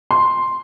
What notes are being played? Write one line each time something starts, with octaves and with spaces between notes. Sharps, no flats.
C6